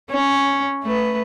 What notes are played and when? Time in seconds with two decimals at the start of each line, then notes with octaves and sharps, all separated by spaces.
0.11 C#4
0.83 A3 B4